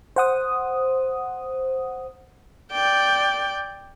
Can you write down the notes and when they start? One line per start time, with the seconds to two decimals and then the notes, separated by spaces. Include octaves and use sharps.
0.16 C5 F#5 D#6
2.72 D5 G5